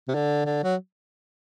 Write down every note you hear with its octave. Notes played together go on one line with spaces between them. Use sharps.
C3
D3
D3
F#3